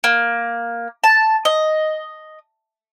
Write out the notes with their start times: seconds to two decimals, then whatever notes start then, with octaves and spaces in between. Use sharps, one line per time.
0.04 A#3
1.04 A5
1.45 D#5